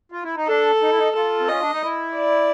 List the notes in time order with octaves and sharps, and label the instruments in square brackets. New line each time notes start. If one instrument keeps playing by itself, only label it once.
[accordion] F4
E4
D#4
[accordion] D4 [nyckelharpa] A4
[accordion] D#4
E4
D#4
[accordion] F4 [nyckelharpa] A4
[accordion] C4
[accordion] C#4 [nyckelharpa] D#5
[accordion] D4
D#4
E4
[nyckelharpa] D5